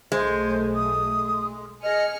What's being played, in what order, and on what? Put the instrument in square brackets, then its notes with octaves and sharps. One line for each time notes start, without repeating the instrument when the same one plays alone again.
[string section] B1 A3 [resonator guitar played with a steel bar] G#3 [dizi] C5
[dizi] D#6
[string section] G#4 F6 C#7 [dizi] D#5